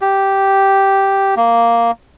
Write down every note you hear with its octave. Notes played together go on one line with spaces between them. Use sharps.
G4
A#3